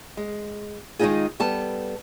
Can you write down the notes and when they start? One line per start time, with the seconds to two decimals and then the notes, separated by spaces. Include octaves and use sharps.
0.17 G#3
0.99 D#3 G#3 B3 D#4 F4 G#4
1.40 G3 B3 A4 A5